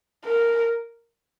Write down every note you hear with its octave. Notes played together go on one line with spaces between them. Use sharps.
A#4